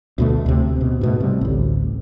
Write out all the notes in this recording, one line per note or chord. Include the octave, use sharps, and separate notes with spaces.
D2 B2 A3
D2 C3
B2
G#2 B2 A3
C3 G3
A1 D2